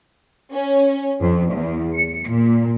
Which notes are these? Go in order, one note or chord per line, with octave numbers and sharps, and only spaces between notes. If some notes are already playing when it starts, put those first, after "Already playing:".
C#4
F2
E2
C#7
A#2